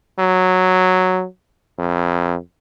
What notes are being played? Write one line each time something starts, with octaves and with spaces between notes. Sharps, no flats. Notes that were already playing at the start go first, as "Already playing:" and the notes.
F#3
F2